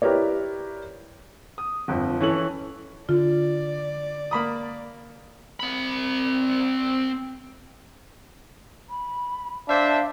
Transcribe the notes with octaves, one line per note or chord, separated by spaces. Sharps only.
E4 G4 A#4 B4 C#5 D5
D#6
G1 F2
E3 C#4 A4 F#7
D3 F4 D5
A#3 B5 D#6
C4 B5
B5
D4 C5 E5 F5